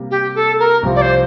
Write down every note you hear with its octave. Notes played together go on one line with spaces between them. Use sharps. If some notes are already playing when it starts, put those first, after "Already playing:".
Already playing: C3 G3 A#3
G4
A4
A#4
C2 C3 F3 C4
D5
C5